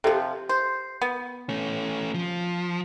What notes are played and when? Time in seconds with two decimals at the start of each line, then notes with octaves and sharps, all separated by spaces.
0.04 C3 F3 G4 A4
0.49 C5
1.02 B3
1.49 A3 C#4
2.14 F3